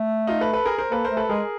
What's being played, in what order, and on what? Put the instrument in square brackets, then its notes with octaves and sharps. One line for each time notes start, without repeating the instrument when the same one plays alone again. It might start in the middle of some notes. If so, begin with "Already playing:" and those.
Already playing: [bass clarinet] A3
[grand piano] D#4 F4
A4 B4
A4 B4
G#4 A#4
A#4 C5
[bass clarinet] A#3 [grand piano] A4 B4
[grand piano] A#4 C5
[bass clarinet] A3
[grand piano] A4 B4
[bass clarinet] G#3 [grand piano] G#4 A#4